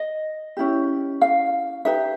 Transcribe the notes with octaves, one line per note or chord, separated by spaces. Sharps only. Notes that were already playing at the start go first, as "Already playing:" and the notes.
Already playing: D#5
C#4 E4 G4
F5
D#4 G4 B4 E5